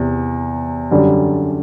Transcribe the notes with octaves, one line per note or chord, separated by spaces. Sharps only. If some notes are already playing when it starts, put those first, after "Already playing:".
Already playing: E2 C3
F#2 D3 G3